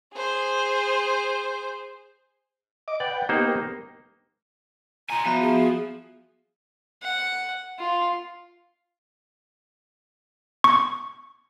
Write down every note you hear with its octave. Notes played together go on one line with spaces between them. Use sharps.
G#4 C5
D#5 D6
B4 D5 F#5 G5
A#3 B3 D#4 G4 A#4 C5
F4 G#5 A#5
F3 B3 F#4 E5
G#4
F#5
F4
C#6